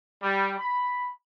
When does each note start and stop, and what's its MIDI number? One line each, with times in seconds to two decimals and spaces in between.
0.22 0.54 55
0.59 1.07 83